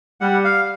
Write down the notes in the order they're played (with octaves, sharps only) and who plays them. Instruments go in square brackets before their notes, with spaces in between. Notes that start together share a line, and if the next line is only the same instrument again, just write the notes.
[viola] G3 [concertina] F#5
[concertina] F5